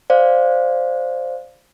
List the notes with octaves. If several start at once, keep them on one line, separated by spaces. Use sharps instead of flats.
C5 D5 F5